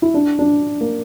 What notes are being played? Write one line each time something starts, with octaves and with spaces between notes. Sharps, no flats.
E4
D4
D4
A#3